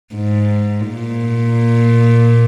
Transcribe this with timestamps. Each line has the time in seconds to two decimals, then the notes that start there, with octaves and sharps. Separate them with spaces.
0.15 G#2
0.89 A#2